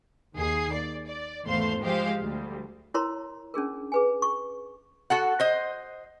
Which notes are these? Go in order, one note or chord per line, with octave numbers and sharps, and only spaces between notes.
D#2 G#4 C7
D5
D5
G#1 E2 A3 C5 F5 C6
F3 G#3 G4 C5 F5
D2 G3
E4 A#4 C#5 A#5 C6
C#4 D4 G#4 A#4
G#4 B4 G#5
C#6
F#4 A4 F#5
C5 D#5